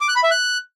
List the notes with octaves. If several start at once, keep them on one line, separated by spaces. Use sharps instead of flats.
D6
F#6
B5
E5
F#6